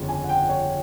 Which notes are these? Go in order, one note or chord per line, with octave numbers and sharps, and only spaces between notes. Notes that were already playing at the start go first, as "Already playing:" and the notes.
Already playing: G1 F2 C#3
G#5
F#5
G5
C#5